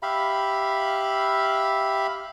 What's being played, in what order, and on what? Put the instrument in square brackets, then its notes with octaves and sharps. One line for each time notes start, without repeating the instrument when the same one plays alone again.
[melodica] G4 E5 F5 B5